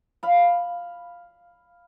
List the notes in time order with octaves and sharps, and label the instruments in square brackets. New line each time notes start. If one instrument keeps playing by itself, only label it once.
[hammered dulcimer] F5 B5